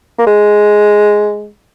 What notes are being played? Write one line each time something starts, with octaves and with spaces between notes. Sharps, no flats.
A#3
G#3